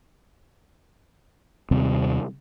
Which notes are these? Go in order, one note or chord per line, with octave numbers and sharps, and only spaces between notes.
D#2 C3 G3 C4